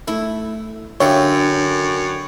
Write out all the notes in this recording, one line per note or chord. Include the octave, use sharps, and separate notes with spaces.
A3 E4
F#2 D3 G4 C#5 E5 F5